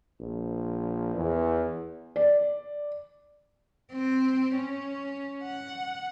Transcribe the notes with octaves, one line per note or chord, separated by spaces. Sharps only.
A#1
E2
D5
C4
C#4
F#5